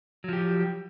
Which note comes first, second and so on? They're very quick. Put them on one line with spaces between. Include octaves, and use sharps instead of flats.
F#3 F3 G4